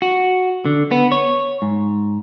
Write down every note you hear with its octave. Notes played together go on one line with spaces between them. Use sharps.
F#4
D3
B3
C#5
G#2